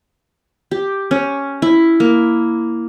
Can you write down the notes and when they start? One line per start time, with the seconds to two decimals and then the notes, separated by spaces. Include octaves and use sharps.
0.71 G4
1.11 C#4
1.62 E4
2.00 A#3